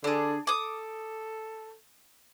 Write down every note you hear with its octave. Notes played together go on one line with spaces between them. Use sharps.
D3 D4 G#4
A4 D6 D#6